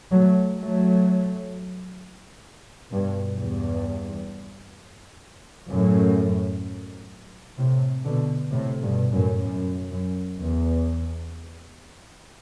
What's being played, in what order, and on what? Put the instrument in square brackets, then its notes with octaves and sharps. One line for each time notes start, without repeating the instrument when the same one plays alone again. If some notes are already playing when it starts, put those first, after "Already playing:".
[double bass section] F#3 A3
F#3 A3
G2 B2
E2 G2
F#2 A2
A2 C3
B2 D3
A2 C3
G2 B2
F#2 A2
F#2
F#2
E2